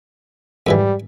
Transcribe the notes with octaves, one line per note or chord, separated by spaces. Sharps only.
F2 G#2 E3 G3